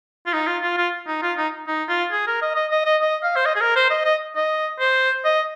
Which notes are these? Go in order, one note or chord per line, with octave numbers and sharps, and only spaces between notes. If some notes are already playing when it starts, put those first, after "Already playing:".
F4
D#4
F4
F4
F4
D#4
F4
D#4
D#4
F4
G#4
A#4
D#5
D#5
D#5
D#5
D#5
F5
C5
D#5
G#4
A#4
C5
D#5
D#5
D#5
C5
D#5